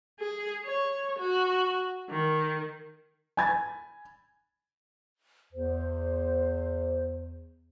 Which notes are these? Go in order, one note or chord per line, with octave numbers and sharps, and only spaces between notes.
G#4
C#5
F#4
D#3
G#5 B5 G#6 A6
E2 C5